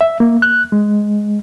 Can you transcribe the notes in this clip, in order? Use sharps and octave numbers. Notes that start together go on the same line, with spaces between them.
E5
A#3
F#6
G#3